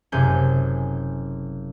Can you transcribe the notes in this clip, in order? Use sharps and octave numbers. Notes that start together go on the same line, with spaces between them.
F#1 C3 G#5 G6